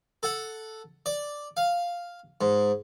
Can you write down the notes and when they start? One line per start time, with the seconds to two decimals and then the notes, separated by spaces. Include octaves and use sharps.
0.23 A4 F#5
1.06 D5
1.57 F5
2.41 G#2